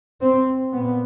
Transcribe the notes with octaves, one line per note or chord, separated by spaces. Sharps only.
C4
A#2 B3